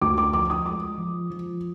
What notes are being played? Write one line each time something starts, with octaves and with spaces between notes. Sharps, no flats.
D2 D6
D6
F3 D6
D#6
G#3 D6
F3
F3